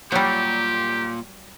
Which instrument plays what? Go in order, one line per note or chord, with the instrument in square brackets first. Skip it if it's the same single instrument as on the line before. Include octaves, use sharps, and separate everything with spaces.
[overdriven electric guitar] A#2 [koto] F#3 G3 [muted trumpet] G4